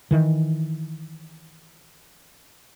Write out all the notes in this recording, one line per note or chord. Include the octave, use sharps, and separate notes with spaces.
D#3 E3